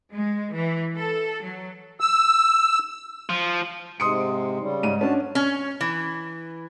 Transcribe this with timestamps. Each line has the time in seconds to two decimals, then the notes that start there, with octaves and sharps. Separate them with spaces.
0.12 G#3
0.54 E3
0.96 A4
1.41 F#3
2.00 E6
3.29 F3
4.00 G#2 C3 G#3 C6 D#6 C#7
4.60 C#3 G3
4.83 G#2 D#7
5.01 C#4 D4 F#4 A5
5.35 C#4
5.81 E3